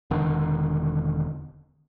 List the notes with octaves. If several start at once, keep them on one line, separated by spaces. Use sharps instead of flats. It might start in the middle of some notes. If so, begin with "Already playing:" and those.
E1 D3 D#3